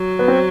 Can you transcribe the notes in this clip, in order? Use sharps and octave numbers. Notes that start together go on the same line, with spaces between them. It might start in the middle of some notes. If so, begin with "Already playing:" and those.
Already playing: F#3
B3
C4